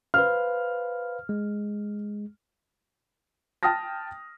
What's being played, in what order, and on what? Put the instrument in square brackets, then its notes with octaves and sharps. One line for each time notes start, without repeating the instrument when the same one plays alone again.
[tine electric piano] B4 C5 F5 [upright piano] F6
[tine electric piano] G#3
[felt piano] G5 A5 D#6 F6 A#6